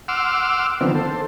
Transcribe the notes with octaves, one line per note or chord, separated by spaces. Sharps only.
F#5 C6 D6 E6 F6
D3 D#3 F3 B3 C4
A4 C5